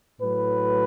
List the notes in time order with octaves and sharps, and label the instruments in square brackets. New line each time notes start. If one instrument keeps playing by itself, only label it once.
[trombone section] A2 F#3 B4